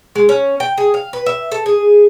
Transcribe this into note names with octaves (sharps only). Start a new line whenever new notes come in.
G#3
C#4
G5
G#4
F5
B4
E5
A4
G#4